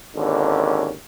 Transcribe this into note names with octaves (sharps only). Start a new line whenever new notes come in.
G#1 D#2 D3 C#4